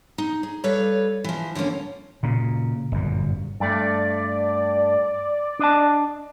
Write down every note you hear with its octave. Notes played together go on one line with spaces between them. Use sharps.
D#4
G#4
G3 A4 B4 C#5 F5
E3 F3
D3 F3 G#3 A#3 C#4
A#2 C#3
G1 F#2 A#2
G2 A3 D5
D4 D#5 A5